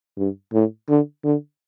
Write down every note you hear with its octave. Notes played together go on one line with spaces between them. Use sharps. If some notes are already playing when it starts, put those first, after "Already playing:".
G2
A2
D3
D3